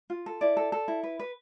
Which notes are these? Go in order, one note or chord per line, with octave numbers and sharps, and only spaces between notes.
F4
A4
E4 D5
A4
A4
E4
B4
B4